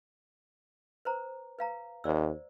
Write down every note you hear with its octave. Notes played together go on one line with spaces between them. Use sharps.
B4 C5 A#5
B4 F5 A#5
D#2 C5 D5 E6